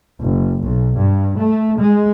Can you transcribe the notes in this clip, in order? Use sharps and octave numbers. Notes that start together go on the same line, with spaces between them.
F#1
B1
G2
A3
G#3